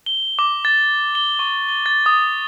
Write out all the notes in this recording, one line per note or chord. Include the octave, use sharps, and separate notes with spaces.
G7
D6
A6
G7
C#6
G7
A6
D#6